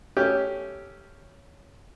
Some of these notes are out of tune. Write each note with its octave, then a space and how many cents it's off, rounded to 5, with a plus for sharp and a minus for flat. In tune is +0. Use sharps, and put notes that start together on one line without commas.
A3 +0 C#4 +5 G4 +0